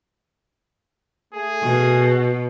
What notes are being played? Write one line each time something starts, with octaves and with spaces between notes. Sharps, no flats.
A3 G#4
B2